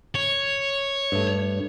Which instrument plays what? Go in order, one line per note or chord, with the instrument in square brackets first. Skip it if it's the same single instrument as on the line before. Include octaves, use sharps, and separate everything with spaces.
[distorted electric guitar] C#5
[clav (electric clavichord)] G2 A3